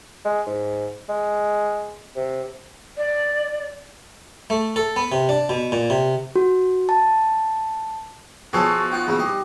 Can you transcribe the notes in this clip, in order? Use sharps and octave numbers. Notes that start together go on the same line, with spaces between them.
G#3
G#2
G#3
C3
D5
A3
A4
B3
C3
D4
B2
A#2
C3
F#4
A5
B2 F3 G#4 A4 C#5
D#4 F4 F#5 G5
E2 A#2 C#3
G3 G4 D#5